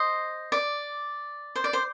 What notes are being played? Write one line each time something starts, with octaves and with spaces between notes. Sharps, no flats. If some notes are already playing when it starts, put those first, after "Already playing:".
Already playing: C5 D#5
D5
C5
D5
C5